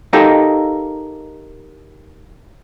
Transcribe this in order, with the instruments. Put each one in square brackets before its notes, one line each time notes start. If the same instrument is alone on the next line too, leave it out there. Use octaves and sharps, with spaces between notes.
[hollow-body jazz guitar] D#4 G4 A4 A#4 D#5 F5